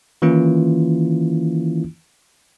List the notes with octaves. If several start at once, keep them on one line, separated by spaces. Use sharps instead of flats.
D#3 E3 A#3 C#4 E4 F4